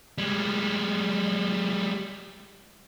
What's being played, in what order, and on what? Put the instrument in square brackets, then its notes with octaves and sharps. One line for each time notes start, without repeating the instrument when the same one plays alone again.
[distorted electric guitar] G3 G#3